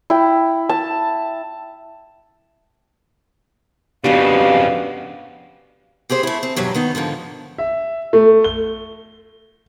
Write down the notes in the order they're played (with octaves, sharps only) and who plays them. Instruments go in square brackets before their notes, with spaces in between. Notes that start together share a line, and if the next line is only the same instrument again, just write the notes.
[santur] E4 G5
A5
[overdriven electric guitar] F2 C#3 [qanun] B3 D4 F#4 [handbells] G4 [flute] F5
[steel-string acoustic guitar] C4 G4 G#4 C5
A3 E4
C4
E2 G2 B2 F#3 G4
D#3 B3 D#4
G#2 D3 D#3 F3
[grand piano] E5
A3
G7